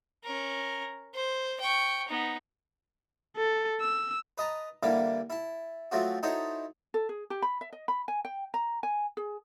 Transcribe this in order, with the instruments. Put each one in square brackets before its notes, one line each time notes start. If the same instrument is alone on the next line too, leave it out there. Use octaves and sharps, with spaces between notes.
[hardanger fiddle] C#4 A#4
C5
G5 C#6
B3 D#4
[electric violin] A4
E6
[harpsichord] B4 D#5 A5 A#5
D3 E3 G3 A#3 E4
E4 A5
F3 F#3 A3 C4 F#4
D#4 E4 F#4 A4 C5 C#5
[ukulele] A4
G#4
G4
B5
E5
D#5
B5
G#5
G5
A#5
G#5
G#4